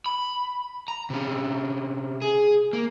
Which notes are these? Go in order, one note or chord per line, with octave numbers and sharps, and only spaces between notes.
B5
A#5
C3 C#4
G#4
A#3